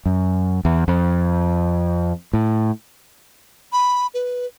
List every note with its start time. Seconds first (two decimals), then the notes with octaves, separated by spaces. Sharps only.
0.06 F#2
0.65 E2
0.88 F2
2.33 A2
3.72 B5
4.14 B4